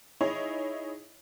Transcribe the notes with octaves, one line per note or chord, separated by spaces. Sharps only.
D#4 E4 G#4 C#5